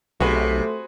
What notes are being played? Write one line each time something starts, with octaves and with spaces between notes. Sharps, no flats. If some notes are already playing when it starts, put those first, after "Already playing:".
B1 C3 A3 F#4 G#4 B4